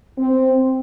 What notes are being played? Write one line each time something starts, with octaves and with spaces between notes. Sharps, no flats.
C4